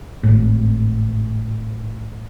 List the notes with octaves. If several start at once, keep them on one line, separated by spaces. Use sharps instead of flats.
G#1 A2